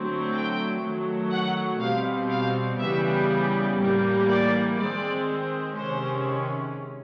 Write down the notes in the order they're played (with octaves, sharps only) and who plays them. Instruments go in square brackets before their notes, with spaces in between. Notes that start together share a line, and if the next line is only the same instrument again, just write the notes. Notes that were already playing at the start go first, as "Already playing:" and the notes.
Already playing: [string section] D3 F#3 A3 C4
G5
D#3 F#3 A3
F#5
B2 G3 C4 F5
F5
C#3 E3 G3 B3 E5
A2 E3 G3 A#3
D5
D#3 G#3 C4 D5
C3 D#3 G#3 C#4 C5